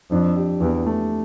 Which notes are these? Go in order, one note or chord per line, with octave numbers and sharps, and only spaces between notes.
F2 D4
G4
E2 G4
A3